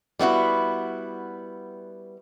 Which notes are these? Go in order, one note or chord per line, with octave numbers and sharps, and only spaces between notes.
G3 B3 E4 F#4